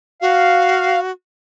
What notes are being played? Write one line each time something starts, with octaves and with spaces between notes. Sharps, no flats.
F#4 F5